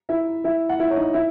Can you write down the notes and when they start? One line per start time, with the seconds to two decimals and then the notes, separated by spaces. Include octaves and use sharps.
0.09 E4 E5
0.44 E4 E5
0.69 F#5
0.79 E4 E5
0.91 C#5
0.96 D#4 D#5
1.14 E4 E5